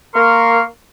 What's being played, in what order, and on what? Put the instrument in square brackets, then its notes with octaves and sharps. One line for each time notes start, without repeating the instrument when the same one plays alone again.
[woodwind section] A#3 A#4 C6 C#6